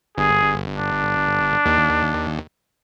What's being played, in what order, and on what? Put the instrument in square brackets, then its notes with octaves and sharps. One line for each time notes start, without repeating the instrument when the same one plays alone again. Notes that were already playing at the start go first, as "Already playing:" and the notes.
[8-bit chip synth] G1 [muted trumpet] G#4
[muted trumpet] D4
[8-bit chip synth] D#2